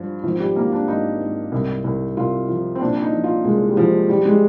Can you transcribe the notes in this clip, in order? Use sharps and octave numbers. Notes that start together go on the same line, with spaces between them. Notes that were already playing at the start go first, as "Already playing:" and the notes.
Already playing: G2 F3
G#1 F3
G3
G#1 A#3
D4
G#1 D#4
G#1
C2
C2
C2 F4
F3
C4
A#2 D4
D#4
F3
F4
C2 G#3
G3
F3
F3 G3
G#3